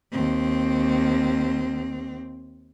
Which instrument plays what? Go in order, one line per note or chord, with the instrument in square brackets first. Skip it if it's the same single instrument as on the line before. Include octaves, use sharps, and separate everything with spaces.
[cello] D#2 C4